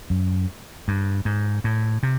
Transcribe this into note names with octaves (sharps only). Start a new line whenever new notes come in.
F#2
G2
G#2
A2
C3